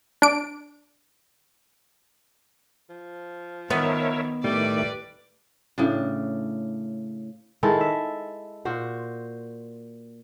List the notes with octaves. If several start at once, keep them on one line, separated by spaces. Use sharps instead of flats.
D4 D7
F3
D#3 B3 A#4 C#5 E5
A2 D#3 G3 A3 B4 D5
A2 C#3 D4
D#3 G#3 E4 A4
E5
A#2 F#4 C5